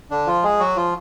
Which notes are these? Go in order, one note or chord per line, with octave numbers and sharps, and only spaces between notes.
D3 D4
F3 F4
G#3 G#4
F#3 F#4
F3 F4